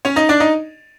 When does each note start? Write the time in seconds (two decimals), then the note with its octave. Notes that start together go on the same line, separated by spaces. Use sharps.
0.05 C#4 C#5
0.16 D#4 D#5
0.29 D4 D5
0.40 D#4 D#5